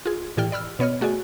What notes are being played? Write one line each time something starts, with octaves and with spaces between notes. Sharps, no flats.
F4 G#4
A2 E3 G4 D5 G5 F6
D5 B5 E6 F6
B2 B3 C#5 D#5 F6
A3 F#4 G#4 D5 G#5